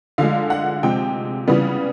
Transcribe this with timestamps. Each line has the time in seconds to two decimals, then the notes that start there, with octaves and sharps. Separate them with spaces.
0.18 D3 F3 G#3 F5
0.50 F#5
0.83 C3 F3 G#3 C4 G5
1.48 C#3 E3 G3 B3